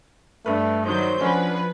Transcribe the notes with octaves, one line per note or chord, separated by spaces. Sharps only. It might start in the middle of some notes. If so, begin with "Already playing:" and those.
G2 A3 B4
D#3 F#3 C5 G6
F3 C#4 D4 F#4 B4